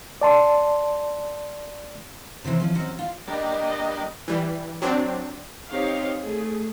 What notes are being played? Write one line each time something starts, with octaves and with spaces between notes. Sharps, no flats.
D5 A5 C6
C3 E3 C4 C#4
F3 C#4
F#3 C4 C#4 F#4
F4
G3 A#3 D4 D#5
E3 G3
F#3 C4 D4
C4 D#4 G4 C#5 F5
A3 G#4